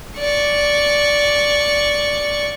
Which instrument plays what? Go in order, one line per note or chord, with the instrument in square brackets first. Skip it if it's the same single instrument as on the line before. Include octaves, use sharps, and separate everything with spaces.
[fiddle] D5 C#6